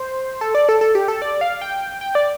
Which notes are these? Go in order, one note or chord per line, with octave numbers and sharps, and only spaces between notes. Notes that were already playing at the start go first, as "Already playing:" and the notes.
Already playing: C5
A4
D5
A4
A4
G4
A4
D5
F5
G5
G5
D5